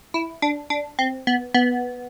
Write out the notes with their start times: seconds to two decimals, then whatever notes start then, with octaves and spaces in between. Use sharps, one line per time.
0.14 E4
0.42 D4
0.70 D4
0.99 C4
1.27 B3
1.54 B3